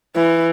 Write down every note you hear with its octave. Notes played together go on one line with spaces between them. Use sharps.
E3